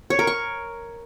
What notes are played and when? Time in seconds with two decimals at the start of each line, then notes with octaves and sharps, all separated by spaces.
0.10 C#5
0.19 A#4
0.27 C#6